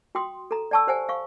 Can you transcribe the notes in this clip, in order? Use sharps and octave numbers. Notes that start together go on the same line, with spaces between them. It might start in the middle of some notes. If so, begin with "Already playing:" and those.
F#4 G5 C6 D#6
A4 A#5
D5 G5 A5 C#6 E6
G4 C5 F#5 G#5
F5 C#6